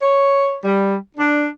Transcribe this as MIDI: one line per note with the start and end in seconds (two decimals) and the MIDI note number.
0.02 0.56 73
0.64 0.96 55
1.17 1.46 62